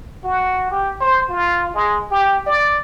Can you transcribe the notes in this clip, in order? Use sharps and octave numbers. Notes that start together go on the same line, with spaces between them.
F#4
G4
C5
F4
G#3
G4
D5